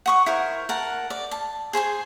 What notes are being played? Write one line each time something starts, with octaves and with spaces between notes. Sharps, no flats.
F#5 C#6 D#6
E4 A#4 C5
A#4 F#5 A5
D5
A5
G#4 C5 G#5 C6